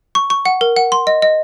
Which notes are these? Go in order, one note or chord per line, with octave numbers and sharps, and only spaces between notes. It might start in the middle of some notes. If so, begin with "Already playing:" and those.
C#6
C#6
F#5
A#4
F#5
C6
D#5
D#5